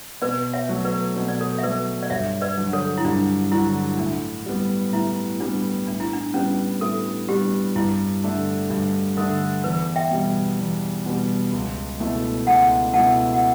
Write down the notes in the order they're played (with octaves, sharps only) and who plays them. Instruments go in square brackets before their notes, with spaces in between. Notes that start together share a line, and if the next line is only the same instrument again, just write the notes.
[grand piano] B2 [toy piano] B4 D5
[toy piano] C#5 E5
[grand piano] F#3 A3
[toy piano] B4 D5
[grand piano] B2 [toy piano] C#5
[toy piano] D5
A4 C#5
E5
[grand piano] F#3 A3 [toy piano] B4 D5
[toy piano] D5
[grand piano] G2 [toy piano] C#5 E5
[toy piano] B4 D5
[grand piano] D3 F#3
[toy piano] A4 C#5
E4
[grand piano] G2 [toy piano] D4
[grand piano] D3 F#3 [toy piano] E4
[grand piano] A2 [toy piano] D4
[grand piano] G3 B3
[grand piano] A2 [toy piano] E4
[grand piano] G3 B3 [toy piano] D4
[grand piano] A2 [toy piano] D4
[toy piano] E4
D4
[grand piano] G3 B3 D4 [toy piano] C#4
[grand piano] A2 [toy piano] A4
[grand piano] G3 B3 D4 [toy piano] G4
[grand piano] G2 [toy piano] E4
[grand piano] D3 A3 D4
[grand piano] G2 [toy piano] D4
[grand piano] D3 A3 D4 [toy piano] A4
[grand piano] E2 [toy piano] B4
[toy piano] E5 G5
[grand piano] B2 G3
E2
B2 G3
C#2
B2 A3 E4
[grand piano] C#2 [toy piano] F#5 A5
[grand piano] B2 A3 E4 [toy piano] F#5 A5
[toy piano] F#5